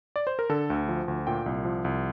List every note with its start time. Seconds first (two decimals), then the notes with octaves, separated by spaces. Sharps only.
0.16 D5
0.27 C5
0.39 A#4
0.49 D3 A4
0.70 D2
0.88 F3
1.08 D2
1.27 A#2 G5
1.46 C2
1.65 F3
1.85 C2